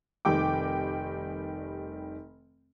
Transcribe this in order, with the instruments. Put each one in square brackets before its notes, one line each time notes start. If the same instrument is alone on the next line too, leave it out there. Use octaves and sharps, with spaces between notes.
[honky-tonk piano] F1 D#3 G3 G5 D6